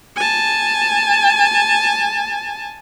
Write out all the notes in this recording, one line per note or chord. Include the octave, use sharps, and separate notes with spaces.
G#5 A5